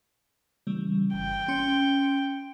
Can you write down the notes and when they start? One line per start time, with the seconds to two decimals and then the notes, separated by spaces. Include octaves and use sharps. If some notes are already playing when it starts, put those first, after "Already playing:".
0.67 C#3 E3 G3
1.14 G1 G5
1.48 C#4 C6 C#7